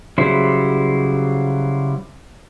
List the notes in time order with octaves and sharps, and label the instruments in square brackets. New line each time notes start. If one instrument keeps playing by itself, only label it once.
[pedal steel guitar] C#3 F#3 G3 E4 C5